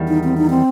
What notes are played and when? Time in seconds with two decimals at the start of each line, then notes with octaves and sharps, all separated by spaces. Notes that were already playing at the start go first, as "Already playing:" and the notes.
Already playing: E2 D#3 G3
0.08 D#4
0.24 C4
0.37 D#4
0.50 C4